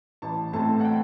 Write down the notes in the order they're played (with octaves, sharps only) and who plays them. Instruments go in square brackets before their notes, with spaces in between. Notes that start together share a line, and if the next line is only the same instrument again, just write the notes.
[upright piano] A1 A5
A2 E3 A3 C4 A5
F#5
G5